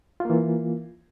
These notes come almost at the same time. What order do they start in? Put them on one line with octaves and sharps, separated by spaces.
F4 A#3 E3